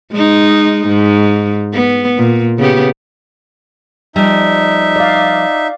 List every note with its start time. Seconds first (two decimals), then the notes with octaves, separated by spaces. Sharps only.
0.12 G#3 D#4
0.88 G#2
1.74 B3
2.17 A#2
2.59 C#3 B3 G4
4.16 F3 G3 D#4 E5
4.96 D5 F5